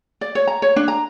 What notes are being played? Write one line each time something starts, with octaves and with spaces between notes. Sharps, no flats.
D5
C#5
A#5
C#5
D4
A#5